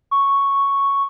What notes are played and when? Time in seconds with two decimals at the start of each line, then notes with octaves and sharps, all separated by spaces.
0.11 C#6